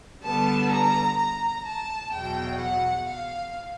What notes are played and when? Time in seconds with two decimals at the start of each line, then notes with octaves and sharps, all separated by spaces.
0.23 D3 G3 B3 A5
0.70 A#5
1.18 A#5
1.65 A5
2.12 E2 B2 F#3 G5
2.59 F#5
3.07 F5